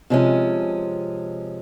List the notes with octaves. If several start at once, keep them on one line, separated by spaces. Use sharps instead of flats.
C3 F3 G#3 C#4